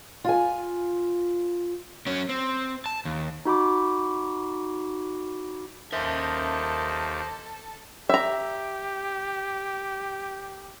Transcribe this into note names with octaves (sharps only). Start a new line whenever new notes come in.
F4 G#5
F#3 C#4
C4
A5
D#2
D#4 F#4 B5 D6
D#2 A4 A#4 C5 D#5 E5 A5
G4 E5 A#5